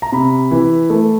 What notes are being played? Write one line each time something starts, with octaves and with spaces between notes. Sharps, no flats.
A#5
C3 B5
E3
A3